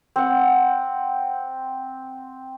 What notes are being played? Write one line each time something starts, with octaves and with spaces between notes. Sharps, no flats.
C4 F#5